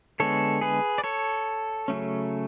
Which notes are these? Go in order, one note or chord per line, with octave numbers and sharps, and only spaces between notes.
D3 G#3 B3 A4 C#5
G#4 B4
D5
A4 C#5
C#3 F#3 A3 C#4